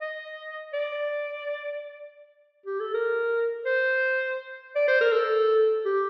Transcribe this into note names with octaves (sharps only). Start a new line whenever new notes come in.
D#5
D5
G4
A4
A#4
C5
D5
C5
A#4
A4
G4